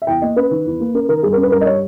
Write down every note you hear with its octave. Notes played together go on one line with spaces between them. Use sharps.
E5
E2 G5
A#3 D#5
C#4 B4
D#3
E2
A#3
C#4 A#4
D#3 A#4
G2 G#4
A#4
C#4
B4
G2 A#4
D#5
G3 C#5